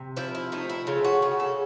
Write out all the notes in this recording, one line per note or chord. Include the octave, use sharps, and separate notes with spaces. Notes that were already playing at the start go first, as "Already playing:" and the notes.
Already playing: C3
F3 E4
E4
A3 D#4
E4
C#3 F4
F#4
C#3 G#4
A4